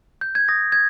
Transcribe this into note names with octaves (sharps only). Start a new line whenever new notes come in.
G6
G#6
D#6 A#6
G#6